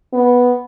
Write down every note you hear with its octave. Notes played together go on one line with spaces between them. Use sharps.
B3